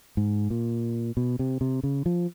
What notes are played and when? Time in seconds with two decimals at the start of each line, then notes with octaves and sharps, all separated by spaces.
0.17 G#2
0.50 A#2
1.17 B2
1.39 C3
1.61 C3
1.83 C#3
2.06 F3